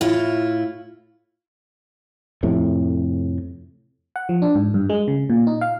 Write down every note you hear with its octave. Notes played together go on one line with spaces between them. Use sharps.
A2 E4 F4
F2 A2 C3
F#5
F3
D4
G#2
G2
G#3
C#3
A#2
D#4
F5